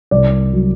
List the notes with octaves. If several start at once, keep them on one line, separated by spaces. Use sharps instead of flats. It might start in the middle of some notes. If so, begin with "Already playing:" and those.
C2 D5
F#3